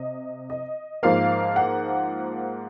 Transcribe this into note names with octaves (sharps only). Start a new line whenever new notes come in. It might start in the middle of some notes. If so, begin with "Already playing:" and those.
Already playing: C3 D#5
D#5
G#2 F3 A#3 F5
F#5